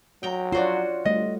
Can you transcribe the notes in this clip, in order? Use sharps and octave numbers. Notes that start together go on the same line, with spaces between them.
F#3 G5 A#5
D4 F4 F#4 C5 C#5
G1 G3 A3 D#5